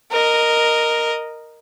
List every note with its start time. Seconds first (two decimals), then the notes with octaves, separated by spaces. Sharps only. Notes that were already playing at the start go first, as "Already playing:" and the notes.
0.11 A#4 D#5